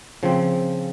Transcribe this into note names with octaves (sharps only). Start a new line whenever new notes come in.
C#3 F3 C4